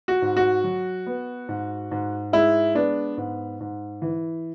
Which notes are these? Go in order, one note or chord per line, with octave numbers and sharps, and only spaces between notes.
F#4
G#2
F#4
F#3
B3
G#2
G#2
G#3 E4
B3 D4
G#2
G#2
E3